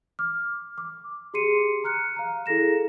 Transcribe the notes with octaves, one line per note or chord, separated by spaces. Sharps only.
D6 F6
D6
G4 G#4 C6 C7 C#7 D#7
A#5 F6 F#6 C#7
F5 A#5
E4 G#4 A4 A#6 E7